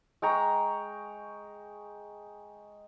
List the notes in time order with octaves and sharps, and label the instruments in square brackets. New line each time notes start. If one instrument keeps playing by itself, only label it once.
[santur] G#3 G5 A#5 C#6